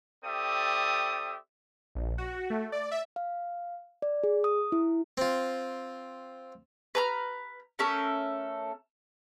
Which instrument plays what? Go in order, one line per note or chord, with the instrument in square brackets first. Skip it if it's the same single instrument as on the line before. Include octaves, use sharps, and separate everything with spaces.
[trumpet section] C4 G4 A4 D5 E5 D#6
[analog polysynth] A#1
F#4
A3
D5
E5
[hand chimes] F5
D5
G#4
D#6
E4
[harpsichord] C4 F4
[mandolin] B4 A#5 F6
A3 C#4 A4 A#4